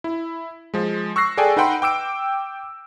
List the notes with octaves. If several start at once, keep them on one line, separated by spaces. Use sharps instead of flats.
E4
F3 G#3
C#6 E6 F#6 A#6 C7
G#4 A4 D5 G5 G#5
D#4 B4 F#5 G5 B5 C6
G5 D6 E6 D7